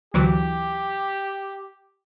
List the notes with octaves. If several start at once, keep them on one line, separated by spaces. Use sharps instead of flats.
D2 E3 F#3 G4